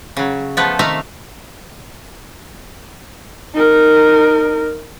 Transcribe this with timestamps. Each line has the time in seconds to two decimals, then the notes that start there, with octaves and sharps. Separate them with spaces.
0.17 C#3 F#3
0.57 F3 A3 B3 A4 B4
0.79 C3 D#3 A3 E5 F5 A#5
3.54 D#4 A#4